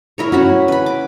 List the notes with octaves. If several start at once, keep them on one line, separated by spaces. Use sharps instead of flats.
E4 A#4 C#5
C#4 E4 F#4 F#5 B5
B4 B5
D6